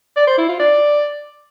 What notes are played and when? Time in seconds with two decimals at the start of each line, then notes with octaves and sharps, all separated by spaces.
0.16 D5
0.27 C5
0.38 E4
0.49 F4
0.60 D5